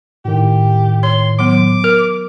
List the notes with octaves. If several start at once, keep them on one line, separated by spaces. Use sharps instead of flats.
A2 D#3 G4
C#5 C6
F#3 B3 D6
A#4